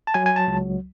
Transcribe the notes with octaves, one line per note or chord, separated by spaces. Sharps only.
A5
F#3 G#5
G#5
A5
C#2